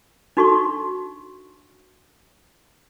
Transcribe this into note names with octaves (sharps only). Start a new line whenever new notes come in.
D4 D#4 F#4 A4 C6 C#6